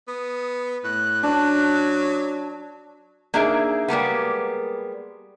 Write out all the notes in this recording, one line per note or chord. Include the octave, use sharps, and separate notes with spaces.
B3 D#6
A2 F#6
F#3 D4
A#3 D4 D#4 G#4 E5
G3 G#3 A#3 B3